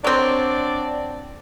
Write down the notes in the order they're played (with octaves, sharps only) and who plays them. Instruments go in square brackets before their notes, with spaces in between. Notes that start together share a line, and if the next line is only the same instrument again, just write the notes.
[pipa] F#3 C4 [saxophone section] D4 D5